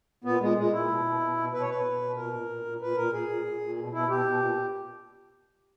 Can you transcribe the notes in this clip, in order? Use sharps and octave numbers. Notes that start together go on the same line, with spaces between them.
A#2 B3
A#2 G#3
A#2 G#3
A#2 E4
B2
B2
B2
B2
B2 B4
C#5
B2 B4
B2
B2
A#2 A#4
A#2
A#2
A#2
A#2 B4
A#2 A#4
A#2 G#4
A#2
A#2
A#2
B2
B2 E4
B2 G4
B2
A#2